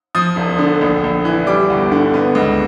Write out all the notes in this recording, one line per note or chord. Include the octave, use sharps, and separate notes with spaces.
F3 D#6
E1
D3
A#1
A#1
E3
G3 D6
G1
D3
B3
C#2